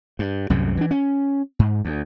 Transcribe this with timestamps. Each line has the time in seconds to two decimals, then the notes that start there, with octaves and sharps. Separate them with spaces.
0.19 G2
0.50 C2 F#2 A2 C3
0.77 E3 D4
0.91 C#4
1.59 G#2
1.85 D2